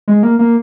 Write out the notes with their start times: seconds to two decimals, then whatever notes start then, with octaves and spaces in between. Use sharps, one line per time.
0.08 G#3
0.23 A#3
0.39 A#3